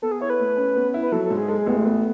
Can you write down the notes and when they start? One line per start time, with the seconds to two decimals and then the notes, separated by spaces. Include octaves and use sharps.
0.02 B3 A4
0.12 G#4
0.20 E4 C#5
0.30 B4
0.40 A3
0.57 C#4
0.76 B3
0.94 E4
1.02 B4
1.12 F#3 A4
1.24 A4
1.30 G#2
1.37 G#4
1.48 G#3 A4
1.58 G#4
1.66 A1 B3
1.77 A3
1.85 B3